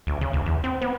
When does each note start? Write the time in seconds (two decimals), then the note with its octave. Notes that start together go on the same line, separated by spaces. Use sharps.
0.07 D2
0.21 C#3
0.33 D2
0.46 E2
0.64 C4
0.82 B3